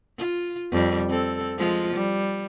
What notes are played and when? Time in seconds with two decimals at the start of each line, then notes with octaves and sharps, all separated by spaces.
0.18 F4
0.72 F2 G3
1.09 C4 A4
1.57 F3 G#3 F4
1.93 G3